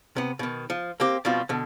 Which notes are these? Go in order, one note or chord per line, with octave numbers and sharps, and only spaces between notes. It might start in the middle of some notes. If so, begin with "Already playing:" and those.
C3 B3
B2 D#3
F3
A#3 C4 G4
B2 F3 G3 C4 F4 F#4
B2 D3